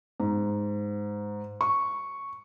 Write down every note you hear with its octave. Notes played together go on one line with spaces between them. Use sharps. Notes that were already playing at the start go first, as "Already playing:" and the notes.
G#2
C#6